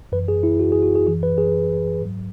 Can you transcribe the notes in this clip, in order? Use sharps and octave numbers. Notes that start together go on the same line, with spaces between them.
F#2 E3 B4
G#4
E4
F#4
G#4
F#4
G#4
F#2 E3 G#4
B4
G#4
G#2 F#3